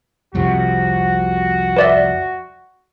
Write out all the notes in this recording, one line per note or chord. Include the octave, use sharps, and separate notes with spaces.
C2 F2 C3 F#4
B4 D5 E5